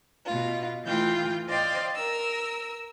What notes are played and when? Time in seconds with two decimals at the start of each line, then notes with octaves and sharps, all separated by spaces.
0.25 B2 F4
0.85 E3 A3 F4 G5 G6
1.48 C5 D5 D#5 F5 G5 C6
1.94 A#4 E6